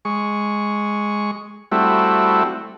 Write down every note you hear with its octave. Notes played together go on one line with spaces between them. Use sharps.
G#3 C#6
G3 A3 C4 E4 F#4